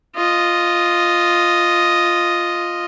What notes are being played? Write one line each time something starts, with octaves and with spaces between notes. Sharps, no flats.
F4 D#5